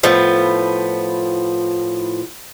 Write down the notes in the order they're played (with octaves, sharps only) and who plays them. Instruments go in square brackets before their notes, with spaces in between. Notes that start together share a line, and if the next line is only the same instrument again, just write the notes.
[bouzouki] A2 F3 B3